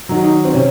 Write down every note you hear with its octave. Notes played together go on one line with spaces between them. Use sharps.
D#3 F#3
D#4
C4
C3 C#4